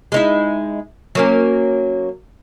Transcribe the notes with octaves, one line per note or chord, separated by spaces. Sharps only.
G#3 D#4 E4
F#3 A#3 C#4